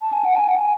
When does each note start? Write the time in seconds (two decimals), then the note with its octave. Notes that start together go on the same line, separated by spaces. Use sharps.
0.02 A5
0.13 G#5
0.25 F#5
0.35 A5
0.39 G#5
0.48 F#5
0.56 G#5